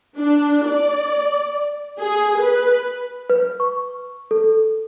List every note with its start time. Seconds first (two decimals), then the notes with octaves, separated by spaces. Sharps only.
0.17 D4
0.66 D5
1.99 G#4
2.39 B4
3.30 B4
3.60 C#6
4.31 A4